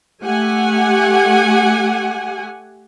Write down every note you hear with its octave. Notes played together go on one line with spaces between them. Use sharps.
A3 G4 F#5 G#5